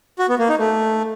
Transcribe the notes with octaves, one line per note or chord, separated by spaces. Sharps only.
F#4
B3
A#3
D#4
A3